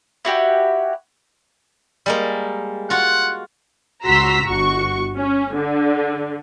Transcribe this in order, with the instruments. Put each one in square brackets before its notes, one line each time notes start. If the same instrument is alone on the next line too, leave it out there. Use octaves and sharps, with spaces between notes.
[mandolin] E4 F#4 G4 D5
[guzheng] G3 G#3 A#3
[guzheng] F4 F#4 [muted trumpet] F#5
[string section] C#2 F#4 A#5 C6 E6 B6
G1 F#4 C#6
C#4
D3